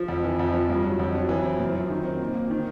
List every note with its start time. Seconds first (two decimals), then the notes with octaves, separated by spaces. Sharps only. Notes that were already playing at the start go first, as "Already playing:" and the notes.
Already playing: F3
0.08 F2
0.24 E3
0.39 F2
0.54 F3
0.70 G2
0.84 F#3
0.99 F2
1.15 F#3
1.29 E3
1.44 C4
1.59 F#2
1.75 F3
1.90 D#3
2.04 C4
2.19 A#2
2.35 A#3
2.50 D#3